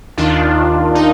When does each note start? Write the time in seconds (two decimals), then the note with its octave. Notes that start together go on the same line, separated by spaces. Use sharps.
0.17 D#2 D#3 D4 F4
0.95 D#4